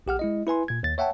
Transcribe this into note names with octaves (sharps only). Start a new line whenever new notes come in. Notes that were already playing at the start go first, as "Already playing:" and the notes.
A#1 G4 F#5 F6
G#3 E4 D#5
E4 B4 G#5 C6
A#2 G#6
D#2 A6
C#5 E5 F#5 G5 A5